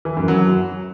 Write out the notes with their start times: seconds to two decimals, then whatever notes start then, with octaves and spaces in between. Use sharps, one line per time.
0.05 E3
0.17 F#2
0.28 F#3